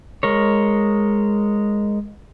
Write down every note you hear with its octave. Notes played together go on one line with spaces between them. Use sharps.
G#3 A#4 C#5